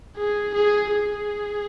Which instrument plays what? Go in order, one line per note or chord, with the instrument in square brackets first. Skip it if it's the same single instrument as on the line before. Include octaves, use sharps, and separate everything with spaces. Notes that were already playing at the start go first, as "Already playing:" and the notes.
[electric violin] G#4
G#4
G#4